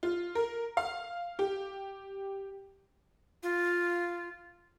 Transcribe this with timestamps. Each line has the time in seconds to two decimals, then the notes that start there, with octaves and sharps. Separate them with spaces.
0.03 F4
0.35 A#4
0.77 F5
1.39 G4
3.43 F4